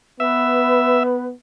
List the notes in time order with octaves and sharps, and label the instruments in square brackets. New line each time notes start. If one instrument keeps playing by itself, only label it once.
[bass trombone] B3 [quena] B4 [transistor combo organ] E5